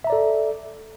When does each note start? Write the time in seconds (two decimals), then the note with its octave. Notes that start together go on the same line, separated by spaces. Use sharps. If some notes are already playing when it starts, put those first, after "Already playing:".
0.04 E5
0.07 A#5
0.10 D5
0.12 A4